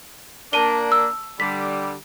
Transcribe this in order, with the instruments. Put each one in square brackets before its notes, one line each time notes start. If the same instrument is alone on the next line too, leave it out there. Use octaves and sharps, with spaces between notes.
[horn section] A#3 D4 [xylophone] A5 D#7 G7
[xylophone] E6
[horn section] D3 G3 [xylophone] B6